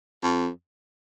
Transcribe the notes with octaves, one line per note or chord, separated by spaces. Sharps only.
F2